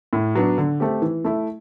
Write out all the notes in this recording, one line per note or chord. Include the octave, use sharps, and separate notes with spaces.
A2
F#3 B3 D4
D3
A3 C4 G4
E3
A3 E4